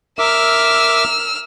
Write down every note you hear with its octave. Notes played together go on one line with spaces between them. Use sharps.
A#4 E5 D6 E6 F6